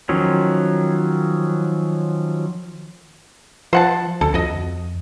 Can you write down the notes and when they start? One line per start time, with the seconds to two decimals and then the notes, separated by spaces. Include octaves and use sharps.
0.09 D#3 F3 F#3 C#4
3.73 F3 C5 F#5 A5
4.21 D2 A4
4.34 F2 F#4 D#5